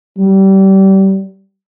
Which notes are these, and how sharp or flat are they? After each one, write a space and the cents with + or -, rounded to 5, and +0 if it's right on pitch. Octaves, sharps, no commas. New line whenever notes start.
G3 -25